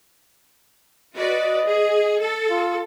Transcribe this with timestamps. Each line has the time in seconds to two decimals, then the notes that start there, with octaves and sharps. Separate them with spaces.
1.18 F#4 B4 D5 D#5
1.67 G#4
2.21 A4
2.50 F4